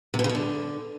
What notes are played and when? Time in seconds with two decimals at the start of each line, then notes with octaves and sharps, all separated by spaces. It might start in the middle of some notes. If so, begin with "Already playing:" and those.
0.14 C3
0.19 B2
0.24 C#3
0.29 B2
0.35 D3